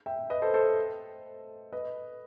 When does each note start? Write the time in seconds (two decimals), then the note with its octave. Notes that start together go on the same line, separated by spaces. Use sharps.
0.06 E5 G5
0.30 B4 D#5
0.42 A4 C5
0.54 A4 C5
1.73 B4 D#5